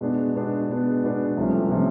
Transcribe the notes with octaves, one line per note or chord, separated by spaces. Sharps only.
B2 G#3 B3 D4
B2 G#3 B3 D4
B2 G#3 B3 D4
B2 G#3 B3 D4
C2 C3 F3 A3 C#4
C3 F3 A3 C#4